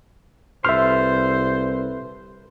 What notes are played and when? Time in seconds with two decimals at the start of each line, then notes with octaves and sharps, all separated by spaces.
0.64 C2 A4 B4 C5 E5 C6 F6